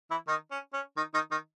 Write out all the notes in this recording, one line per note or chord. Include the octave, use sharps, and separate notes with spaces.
E3 E4
D#3 D#4
C#4
C#4
D#3 D#4
D#3 D#4
D#3 D#4